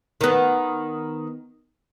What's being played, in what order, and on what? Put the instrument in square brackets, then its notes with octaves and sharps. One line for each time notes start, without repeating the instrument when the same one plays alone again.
[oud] D#3 B3